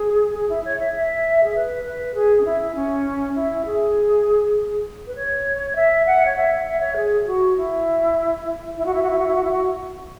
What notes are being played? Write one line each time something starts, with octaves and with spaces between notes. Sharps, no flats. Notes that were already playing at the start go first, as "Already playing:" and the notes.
Already playing: G#4
G#4
E4
C#5
E5
E5
G#4
B4
B4
G#4
C#4
E4
C#4
E4
G#4
B4
C#5
C#5
E5
F#5
C#5
E5
E5
C#5
G#4
G#4
F#4
E4
E4
F#4
E4
F#4
E4
F#4
E4
F#4
E4
F#4